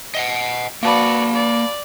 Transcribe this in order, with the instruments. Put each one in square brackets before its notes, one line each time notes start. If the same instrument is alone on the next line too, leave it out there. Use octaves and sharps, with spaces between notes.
[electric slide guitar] D#5 F5 F#5
[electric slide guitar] A#3 B4 [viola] F#4 D5 [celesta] F5 A5 B5
[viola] D5